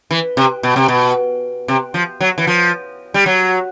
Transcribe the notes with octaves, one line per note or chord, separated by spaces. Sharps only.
E3
C3
B2
C3
B2
C3
F3
F#3
E3
F3
G3
F#3